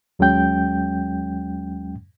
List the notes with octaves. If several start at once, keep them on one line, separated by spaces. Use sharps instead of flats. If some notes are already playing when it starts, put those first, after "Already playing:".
D#2 F#3 G#3 C#4 G5 G6